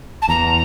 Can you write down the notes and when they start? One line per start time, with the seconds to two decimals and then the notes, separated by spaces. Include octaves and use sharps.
0.22 A5
0.29 E2 A#5